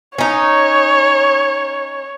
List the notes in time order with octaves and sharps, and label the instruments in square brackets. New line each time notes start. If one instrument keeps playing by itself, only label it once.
[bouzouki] C#4 D#4 [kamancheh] C#5